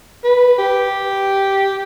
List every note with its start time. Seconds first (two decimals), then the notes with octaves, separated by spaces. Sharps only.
0.24 B4
0.58 G4